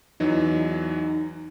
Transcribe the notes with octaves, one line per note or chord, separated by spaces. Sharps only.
E2 E3 F#3 D#4